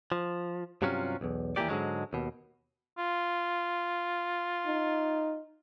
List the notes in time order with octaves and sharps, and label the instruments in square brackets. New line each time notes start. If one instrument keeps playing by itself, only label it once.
[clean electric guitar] F3
G2 C3 F#3 C#4 F4
B1 E2
D#2 E3 G#3 A#3 G4 D5
G#2 D3 F#3 G#3
D#2 B2
[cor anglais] F4
[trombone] D#4